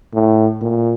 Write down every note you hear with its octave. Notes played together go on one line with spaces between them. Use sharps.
A2
A#2